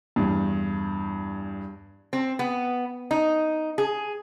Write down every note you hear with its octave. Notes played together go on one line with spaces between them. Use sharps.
E2 G2
C4
B3
D#4
G#4